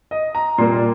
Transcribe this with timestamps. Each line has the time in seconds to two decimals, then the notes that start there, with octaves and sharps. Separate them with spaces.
0.11 D#5
0.35 A#5
0.58 A#2 G3 A#3 C6